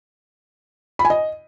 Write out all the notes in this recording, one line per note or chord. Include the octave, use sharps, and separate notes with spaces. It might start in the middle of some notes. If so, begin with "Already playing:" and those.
B5
G#5
D#5